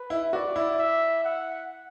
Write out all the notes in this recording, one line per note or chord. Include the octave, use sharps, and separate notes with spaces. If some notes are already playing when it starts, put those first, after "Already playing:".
Already playing: B4
E4
F#4 D5
E4
E5
F#5